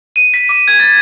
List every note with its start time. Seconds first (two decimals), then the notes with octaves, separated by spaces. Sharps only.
0.16 D#7
0.34 B6
0.49 D6
0.68 G#6
0.80 A6